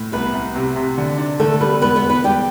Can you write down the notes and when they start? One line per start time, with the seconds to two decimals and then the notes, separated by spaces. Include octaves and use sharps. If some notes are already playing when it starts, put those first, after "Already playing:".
Already playing: A2
0.12 C2 B3 B4
0.33 C2
0.55 C3
0.76 C3
0.98 D3
1.18 D4
1.39 D3 A3 A4
1.60 G3 B3 B4
1.81 E1 B3 B4
1.96 B3 B4
2.03 E1
2.10 B3 B4
2.24 E1 G3 G4